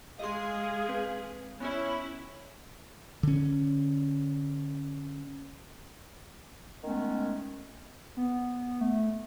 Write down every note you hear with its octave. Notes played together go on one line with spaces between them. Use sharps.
G#3 G#4 D#5 F5 C6
C4 B4
B3 C#4 E4 C#5
D3 C#4
D#3 G#3 A3 B3 C#4
B3
A3